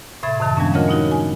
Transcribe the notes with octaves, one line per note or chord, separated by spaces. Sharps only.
A2 C3 E5 B5 G#6 A6
F#2 C3 D#3 A5
F3 G3 G#3 B3 C#4 D4
F4 A#4 C#5 D#5 F#5
B3 D#4 F4 F#4
G#5